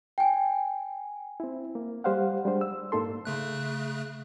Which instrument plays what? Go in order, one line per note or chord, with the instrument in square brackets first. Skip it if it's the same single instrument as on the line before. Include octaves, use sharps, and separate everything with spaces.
[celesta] G5 G#5
[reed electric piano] C4 E4
A#3
G3 G4 C5 F5 F#5
G3 G#3 D4 C5
E6
G#2 A#3 D#4 A4 C6
[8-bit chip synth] C#3 A3 F#6